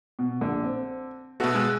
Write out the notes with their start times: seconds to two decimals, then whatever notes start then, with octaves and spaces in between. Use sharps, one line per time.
0.19 B2
0.41 A#1 D3
0.64 C4
1.40 B2 A3 B3 F#4 A4
1.55 G#3 E6 F#6